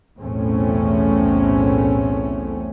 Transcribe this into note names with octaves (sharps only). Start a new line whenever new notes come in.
B1 E2 A2 A3 C4 C#4